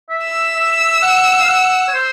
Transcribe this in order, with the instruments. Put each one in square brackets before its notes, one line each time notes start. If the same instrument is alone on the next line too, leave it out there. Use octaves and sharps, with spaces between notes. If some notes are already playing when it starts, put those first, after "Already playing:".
[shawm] E5
[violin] E6
[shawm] E5
F#5
F5
F#5
C#5
C5